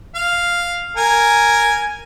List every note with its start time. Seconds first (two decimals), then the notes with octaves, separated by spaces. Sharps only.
0.15 F5
0.97 A#4 G#5